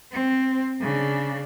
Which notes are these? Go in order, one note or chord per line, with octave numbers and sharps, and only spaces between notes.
C4
C#3 D4